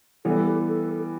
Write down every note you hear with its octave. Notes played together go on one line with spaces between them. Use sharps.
E3 G3 B3 A4
G4
A4
G4